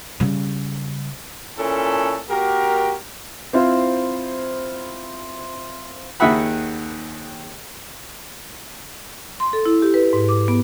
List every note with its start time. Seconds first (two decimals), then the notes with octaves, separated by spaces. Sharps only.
0.20 C#3 G3
1.58 A#2 C#4 E4 A4
2.29 A#3 F#4 G4 A#4
3.53 C4 E4 F4 C5
6.20 D#2 D#3 G#4 E5 F#5 B5
9.40 C6
9.53 A4
9.66 E4
9.82 G4
9.94 B4
10.13 G#2
10.29 D6
10.48 B3